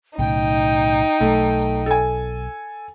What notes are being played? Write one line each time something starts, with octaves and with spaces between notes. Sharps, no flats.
B1 A2 C#3 D#4 G5
B1 A3
A4 G#5